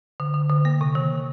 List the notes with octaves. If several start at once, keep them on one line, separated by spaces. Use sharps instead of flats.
D3
D3
D3
A#3
C3
D#3